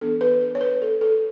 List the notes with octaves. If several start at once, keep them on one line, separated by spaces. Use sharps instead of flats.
E3 B3 D4 A4
B4
B4
C#5
B4
A4
A4